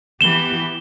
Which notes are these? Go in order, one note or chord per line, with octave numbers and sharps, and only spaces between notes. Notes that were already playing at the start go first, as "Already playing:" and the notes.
E3 B3 G4 E7 G7